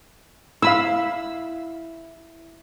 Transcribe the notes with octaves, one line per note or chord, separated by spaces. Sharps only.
E4 F5 B5 E6